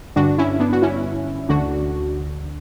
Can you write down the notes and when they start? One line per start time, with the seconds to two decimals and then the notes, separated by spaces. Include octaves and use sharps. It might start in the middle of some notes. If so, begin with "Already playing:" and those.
0.16 G2 D3 D4 F#4
0.38 C#4 E4
0.60 B3 D4
0.72 F#4
0.82 C#4 E4
1.49 D2 D3 D4 F#4